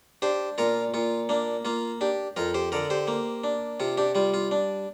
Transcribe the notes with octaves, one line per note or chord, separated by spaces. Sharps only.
D4 G4 C5
A#2 F4 A#4
A#2 F4
A#3 D4
A#3 F4
D4 G4
F2 F4 A#4
G4 C5
D3 A#4 D5
G4 C5
A#3
D4
C3 F4
D4 G4
G3 F4
F4
D4